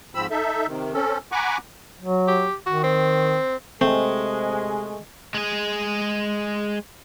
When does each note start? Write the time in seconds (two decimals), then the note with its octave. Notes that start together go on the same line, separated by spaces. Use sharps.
0.15 G#2 F3 C4 B5 E6
0.31 D#4 A4 E5
0.67 C3 D#3
0.94 C4 C#4 A4
1.32 F#5 G#5 A#5 B5 C#6 D6
2.00 F#3
2.28 G4
2.66 D#3 F#4
2.83 C4
3.81 C3 G#3 A3 C4
5.34 G#3 G#4